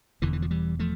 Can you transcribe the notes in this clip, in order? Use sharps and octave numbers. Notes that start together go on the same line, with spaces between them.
E1 E2 D3 E3
E3
F3
E3 G3
F3 A3